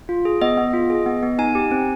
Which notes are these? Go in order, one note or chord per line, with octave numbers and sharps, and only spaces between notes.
F4
G#4
B3 D#5
B3
F4
G#4
B3
B3
D#4 G#5
G4
C4